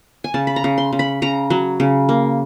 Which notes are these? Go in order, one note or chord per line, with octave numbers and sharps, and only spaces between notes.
G#5
C#3 A5
B5
A#5
C#3
C6
C#3
B5
C#3 A#5
F#3
C#3
A#3